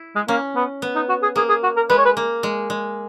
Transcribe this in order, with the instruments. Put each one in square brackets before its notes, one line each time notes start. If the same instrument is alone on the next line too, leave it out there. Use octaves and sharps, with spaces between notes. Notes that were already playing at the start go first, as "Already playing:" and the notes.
Already playing: [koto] E4
[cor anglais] G#3
[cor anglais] A#3 [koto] C#4
[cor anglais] B3
[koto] B3
[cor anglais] D#4
F#4
G#4
[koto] A#3 [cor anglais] G#4
[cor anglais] G#4
F#4
A#4
[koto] G#3 [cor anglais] B4
[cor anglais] C#5
B4
[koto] A#3
G#3
G#3